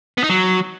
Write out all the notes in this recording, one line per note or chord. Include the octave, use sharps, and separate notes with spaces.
B3
D#4
F#3